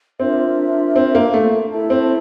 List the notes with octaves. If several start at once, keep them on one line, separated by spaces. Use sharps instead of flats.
C4 D4 F4 A#4 E5
C4
A#3
A3
E4 A4 E5 A5
C4